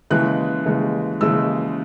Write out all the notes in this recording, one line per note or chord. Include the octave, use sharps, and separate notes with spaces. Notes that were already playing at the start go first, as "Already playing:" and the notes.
D#2 C#3 E3 G#3 F#6
D#2 C#3 E3 G#3
D#2 C#3 E3 G#3 E6